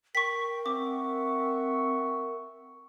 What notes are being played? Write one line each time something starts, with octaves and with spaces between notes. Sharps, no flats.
A#4 G5 C#6 B6
C4 E5 F#5 C#6 D6